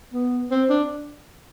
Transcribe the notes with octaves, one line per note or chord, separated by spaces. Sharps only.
B3
C4
D4